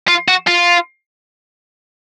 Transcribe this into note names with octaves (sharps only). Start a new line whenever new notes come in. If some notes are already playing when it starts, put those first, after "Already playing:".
F4
F#4
F4